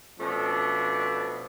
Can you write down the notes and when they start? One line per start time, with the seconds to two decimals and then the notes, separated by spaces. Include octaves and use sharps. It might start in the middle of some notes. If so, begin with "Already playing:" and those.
0.19 B2 F3 A3 C#4 D4